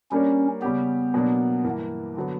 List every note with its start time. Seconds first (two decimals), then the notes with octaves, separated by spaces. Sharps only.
0.12 G3 A#3 C#4 D4 A#4 C#5
0.62 C#3 G3 B3 C#4 G4
1.14 B2 F#3 A#3 D4
1.64 G2 E3 A#3
2.17 D3 F#3 B3